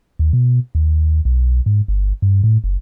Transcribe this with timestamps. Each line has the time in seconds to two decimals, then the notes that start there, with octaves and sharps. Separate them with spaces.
0.19 D#2
0.33 B2
0.75 D#2
1.25 B1
1.66 G#2
1.88 G1
2.22 G2
2.44 A2
2.64 F#1